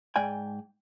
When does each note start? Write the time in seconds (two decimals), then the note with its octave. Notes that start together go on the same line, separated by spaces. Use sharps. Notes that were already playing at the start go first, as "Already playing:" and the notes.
0.16 G#2 D5 G5 G#5